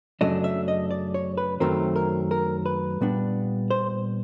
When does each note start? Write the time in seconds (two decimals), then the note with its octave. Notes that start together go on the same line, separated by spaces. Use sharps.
0.21 F#2 C#3 F#3 A3 D4 D#5
0.44 E5
0.68 D#5
0.91 D5
1.14 C#5
1.38 B4
1.60 F#2 D#3 F#3 A3 C4 A#4
1.96 A#4
2.31 A#4
2.66 B4
3.01 A#2 G3 B3 D4
3.70 C5